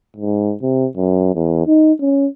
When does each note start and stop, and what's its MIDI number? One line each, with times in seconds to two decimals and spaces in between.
0.16 0.53 44
0.62 0.86 48
0.96 1.32 42
1.35 1.63 40
1.67 1.92 63
2.00 2.26 61